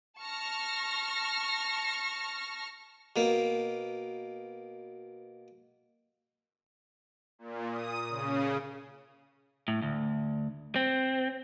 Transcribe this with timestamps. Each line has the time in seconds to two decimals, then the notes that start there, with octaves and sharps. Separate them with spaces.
0.19 A5 C#6 F6 A#6
3.16 B2 A#3
7.39 A#2
7.70 D#6
8.09 C#3
9.68 A2
9.82 D2
10.76 C4